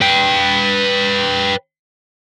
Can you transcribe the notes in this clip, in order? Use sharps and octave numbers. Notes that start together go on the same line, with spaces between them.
B4 G5